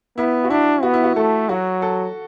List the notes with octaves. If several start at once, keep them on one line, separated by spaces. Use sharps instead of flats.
B3 E4
F#4
D4 E4
B3 F#4
E4
F#4
A3 A4
F#3 F#4
A4